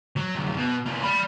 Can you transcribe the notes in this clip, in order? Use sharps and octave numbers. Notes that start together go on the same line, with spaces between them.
F#3
C2 F#2
B2
C3 A#3
D5 B5